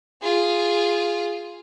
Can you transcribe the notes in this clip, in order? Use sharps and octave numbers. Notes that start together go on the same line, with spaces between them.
F4 G#4